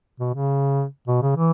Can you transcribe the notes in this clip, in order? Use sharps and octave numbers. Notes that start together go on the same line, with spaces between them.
B2
C#3
B2
C#3
E3